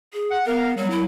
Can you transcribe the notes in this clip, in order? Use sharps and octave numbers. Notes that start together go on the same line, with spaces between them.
G#4
F#5
B3 A#4 F5
F#3 G3
E4